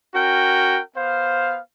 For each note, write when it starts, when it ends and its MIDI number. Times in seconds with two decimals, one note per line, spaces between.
0.14 0.81 61
0.14 0.81 66
0.14 0.81 70
0.14 0.81 79
0.96 1.60 59
0.96 1.60 72
0.96 1.60 77